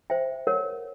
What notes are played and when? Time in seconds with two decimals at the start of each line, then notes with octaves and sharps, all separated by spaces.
0.10 C5 E5 G5
0.47 A#4 C#5 F#5